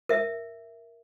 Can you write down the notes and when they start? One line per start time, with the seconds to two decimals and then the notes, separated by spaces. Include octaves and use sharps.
0.09 A#4 E5